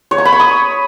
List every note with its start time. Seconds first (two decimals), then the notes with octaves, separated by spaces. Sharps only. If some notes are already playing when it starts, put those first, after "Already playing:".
0.11 C#5
0.18 A#5
0.25 B5
0.33 C#6
0.40 D#6